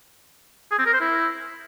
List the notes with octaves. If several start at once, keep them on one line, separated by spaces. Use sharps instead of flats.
G#4
C4
A#4
C5
E4